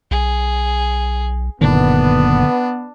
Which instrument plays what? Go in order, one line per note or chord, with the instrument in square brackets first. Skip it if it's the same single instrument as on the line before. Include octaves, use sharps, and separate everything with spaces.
[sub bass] B1 [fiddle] G#4
[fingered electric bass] F#1 A#2 D#3 [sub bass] D3 [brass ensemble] B3 [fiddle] D4